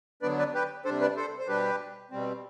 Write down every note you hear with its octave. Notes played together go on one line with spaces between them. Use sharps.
D3 F#3 B3 D4 B4 D5
B4 D5
G4 B4
C3 G3 D4 A4 C5
B4 D5
A4 C5
C5
B2 G3 D4 G4 B4
B2 G3 C4